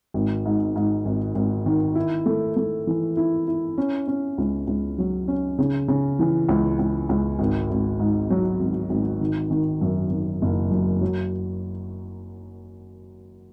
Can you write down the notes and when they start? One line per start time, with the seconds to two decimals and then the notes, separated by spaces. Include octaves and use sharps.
0.14 G#1
0.46 G#2
0.76 G#2
1.05 G#1
1.35 G#1
1.66 D#3
1.95 E4
2.26 A3
2.56 A3
2.87 E3
3.17 E4
3.48 E4
3.78 C#4
4.07 C#4
4.38 C#2
4.67 C#2
4.98 F#3
5.28 C#4
5.58 C#3
5.88 C#3
6.19 E3
6.48 C#2
6.79 C#2
7.09 C#2
7.39 G#1
7.70 G#1
7.99 G#2
8.30 F#3
8.60 G#1
8.90 G#1
9.21 D#3
9.51 D#3
9.81 F#2
10.11 D#3
10.42 F#1
10.71 F#2
11.01 F#3